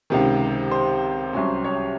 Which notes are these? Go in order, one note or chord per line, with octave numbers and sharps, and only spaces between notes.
C#2 C3 D#3
C5
C2 C3 F#3 C#4
C#5